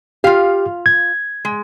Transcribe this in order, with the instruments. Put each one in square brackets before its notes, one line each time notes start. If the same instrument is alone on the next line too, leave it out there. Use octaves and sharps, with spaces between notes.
[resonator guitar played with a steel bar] F4 F5 [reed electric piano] G4
[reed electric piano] G#6
[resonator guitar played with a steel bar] G#3